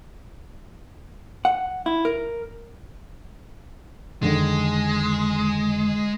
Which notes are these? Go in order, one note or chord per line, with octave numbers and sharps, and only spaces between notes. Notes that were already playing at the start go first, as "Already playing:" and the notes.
F#5
E4
A#4
F2 D3 D#3 G#3